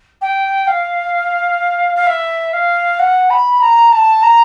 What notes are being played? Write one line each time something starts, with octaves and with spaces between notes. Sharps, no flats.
G5
F5
F5
E5
F5
F#5
B5
A#5
A5
A#5